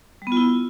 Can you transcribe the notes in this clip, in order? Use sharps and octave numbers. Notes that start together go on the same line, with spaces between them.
G3
B3
F4
E4